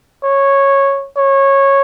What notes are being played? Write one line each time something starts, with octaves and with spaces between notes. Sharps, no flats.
C#5
C#5